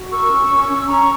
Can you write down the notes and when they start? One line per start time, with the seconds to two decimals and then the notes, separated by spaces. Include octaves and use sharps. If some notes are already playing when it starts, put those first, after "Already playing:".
Already playing: F#4
0.11 A#4 C#6 E6
0.30 C#4
0.48 C#4
0.68 C#4
0.87 C#4 A#5 C#6